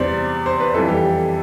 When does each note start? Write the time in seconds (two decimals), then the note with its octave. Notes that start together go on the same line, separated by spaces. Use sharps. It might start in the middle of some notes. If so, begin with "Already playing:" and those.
Already playing: E2 C3 G3 C5 D5
0.46 C5
0.60 B4
0.74 F2 E3 G3 A4
0.88 G4